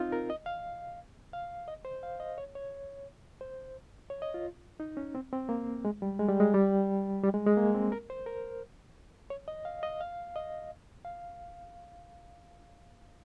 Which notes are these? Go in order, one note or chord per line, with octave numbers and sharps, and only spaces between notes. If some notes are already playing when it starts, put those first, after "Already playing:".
Already playing: C4 D#4 F4
A#4
D#5
F5
F5
D#5
C5
F5
D#5
C#5
C#5
C5
C#5
D#5
F4
D#4
C#4
C4
C4
A#3
G#3
G3
G#3
G3
G#3
G3
G3
G#3
G#3
A#3
C4
A#4
C5
A#4
C#5
D#5
F5
D#5
F5
D#5
F5